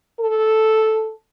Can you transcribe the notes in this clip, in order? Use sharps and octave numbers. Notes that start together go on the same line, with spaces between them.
A4